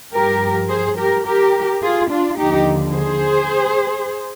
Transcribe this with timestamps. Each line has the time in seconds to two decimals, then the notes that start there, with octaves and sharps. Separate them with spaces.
0.13 G2 F3 G4 A#4
0.69 G#4 C5
0.97 G4 A#4
1.26 G4 A#4
1.82 F4 G#4
2.10 D4 F4
2.38 D#2 D3 F3 D#4 G4
2.95 G#4 C5